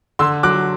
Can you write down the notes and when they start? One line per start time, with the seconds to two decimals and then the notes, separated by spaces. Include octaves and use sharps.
0.19 D3 C6 E6
0.43 F#3 D6 F#6